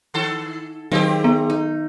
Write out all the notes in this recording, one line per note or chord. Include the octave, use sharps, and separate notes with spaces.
D#3 A4
D#3 F#3 C4 G4 G#4
B3
D#4